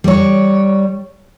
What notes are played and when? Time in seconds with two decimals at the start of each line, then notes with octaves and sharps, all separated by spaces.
0.04 G3 C#5